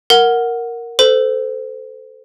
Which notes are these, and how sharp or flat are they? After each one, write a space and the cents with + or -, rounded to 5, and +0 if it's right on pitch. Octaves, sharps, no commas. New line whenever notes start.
A#4 +0 F#5 -5
A4 +0 C5 -25